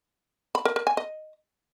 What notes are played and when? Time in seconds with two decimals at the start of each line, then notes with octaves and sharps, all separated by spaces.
0.55 B5
0.65 A#4
0.76 A#4
0.87 G#5
0.97 D#5